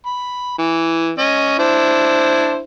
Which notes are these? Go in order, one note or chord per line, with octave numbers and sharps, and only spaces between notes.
B5
E3
C#4 D#5
D4 E4 C5